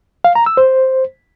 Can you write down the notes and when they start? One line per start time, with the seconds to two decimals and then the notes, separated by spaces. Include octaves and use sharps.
0.24 F5
0.35 A#5
0.46 E6
0.57 C5